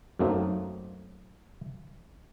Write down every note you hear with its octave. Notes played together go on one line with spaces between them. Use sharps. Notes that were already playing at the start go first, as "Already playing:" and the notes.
F#2 F#3 A3 A#3 C4 D#4